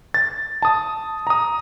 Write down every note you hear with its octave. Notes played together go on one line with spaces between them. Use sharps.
A6
A5 D#6
A#5 D#6